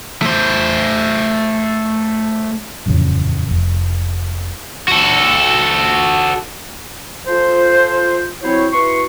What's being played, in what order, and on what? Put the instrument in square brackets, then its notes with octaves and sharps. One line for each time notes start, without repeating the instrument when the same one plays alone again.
[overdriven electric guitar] A3 C5
[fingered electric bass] D#1 A1 F2 C#3
F1
[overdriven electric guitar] F#4 A4
[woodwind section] F3 F4 A4 C5
F#3 C4 E4 C5 C#5
E4 F#4 B4 C6 C#6